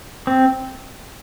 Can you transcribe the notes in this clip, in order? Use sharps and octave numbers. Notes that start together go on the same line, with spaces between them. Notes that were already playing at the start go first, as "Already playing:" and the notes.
C4